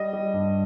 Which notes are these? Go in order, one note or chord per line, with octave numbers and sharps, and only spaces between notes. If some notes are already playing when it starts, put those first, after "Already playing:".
Already playing: G3 D#5
G3
G2